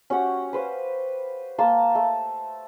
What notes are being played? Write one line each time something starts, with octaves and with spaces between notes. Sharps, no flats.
C#4 F#4 G4 F#5
B4 C5 F5
A#3 A5 C6
A3